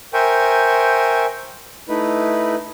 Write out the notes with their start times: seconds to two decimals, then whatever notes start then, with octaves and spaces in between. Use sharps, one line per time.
0.14 A#4 C5 E5 G5 G#5 C#6
1.89 A3 D#4 E4 B4